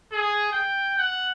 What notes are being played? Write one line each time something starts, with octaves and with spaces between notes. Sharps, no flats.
G#4
G5
F#5